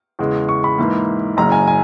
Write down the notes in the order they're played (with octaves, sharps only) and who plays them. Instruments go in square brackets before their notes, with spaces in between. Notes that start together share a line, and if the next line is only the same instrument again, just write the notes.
[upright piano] E2 C#3 G#3
C#6
B5
G#2 E3 A#3
F#1 F#2 C#3 A#5
G#5
G#5